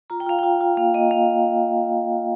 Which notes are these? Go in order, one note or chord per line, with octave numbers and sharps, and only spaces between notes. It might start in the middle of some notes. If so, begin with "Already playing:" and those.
F4 A#5
G5
F4 F5
F4 G5
F4
A#3 F5
A#3 D#5
A#3 F5